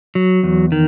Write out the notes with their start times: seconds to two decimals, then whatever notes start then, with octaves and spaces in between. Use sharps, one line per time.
0.15 F#3
0.43 E2
0.72 D#3